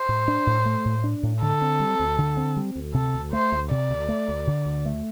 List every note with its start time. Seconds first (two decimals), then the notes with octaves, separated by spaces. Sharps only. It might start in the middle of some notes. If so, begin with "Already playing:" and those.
Already playing: C5
0.09 A2
0.28 D4
0.47 A2
0.66 A3
0.85 A2
1.04 D4
1.23 A2
1.42 D3 A4
1.62 C4
1.80 G3
2.00 D2
2.18 D3
2.37 C4
2.57 G3
2.75 D2
2.94 C3 A4
3.14 D2
3.33 A3 C5
3.52 D2
3.71 C3 D5
3.90 D2
4.09 A3
4.28 D2
4.47 D3
4.66 D2
4.85 A3